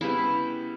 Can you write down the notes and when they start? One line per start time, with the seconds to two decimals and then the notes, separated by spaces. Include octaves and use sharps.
0.01 C#3 G3 B3 E4